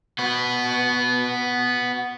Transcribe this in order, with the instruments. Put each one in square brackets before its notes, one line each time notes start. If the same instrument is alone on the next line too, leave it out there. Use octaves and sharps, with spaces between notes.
[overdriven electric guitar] B3 F#4